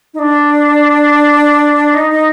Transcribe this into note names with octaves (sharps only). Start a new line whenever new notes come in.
D#4
D4
D#4
D#4